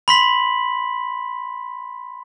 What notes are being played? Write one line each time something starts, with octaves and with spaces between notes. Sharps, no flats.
B5 C6 B6 F#7